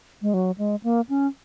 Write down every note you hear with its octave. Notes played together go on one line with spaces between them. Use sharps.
G#3
F#3
G#3
A#3
C#4